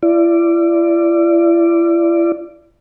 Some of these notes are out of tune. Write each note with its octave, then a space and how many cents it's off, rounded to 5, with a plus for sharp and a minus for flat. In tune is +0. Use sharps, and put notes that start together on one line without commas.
E4 +40 D5 +0